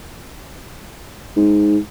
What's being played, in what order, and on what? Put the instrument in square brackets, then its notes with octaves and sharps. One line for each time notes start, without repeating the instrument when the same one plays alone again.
[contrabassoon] G#2